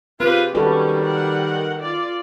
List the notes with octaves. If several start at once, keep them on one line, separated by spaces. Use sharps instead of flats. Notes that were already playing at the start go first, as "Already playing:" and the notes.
C4 F4 G4 G#4 B4
D#3 G3 C#4 F#4 A4 B4
A#4 F#5
F4 D5